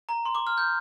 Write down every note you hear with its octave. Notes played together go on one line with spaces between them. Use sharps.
A#5
C6
D6
F6
G6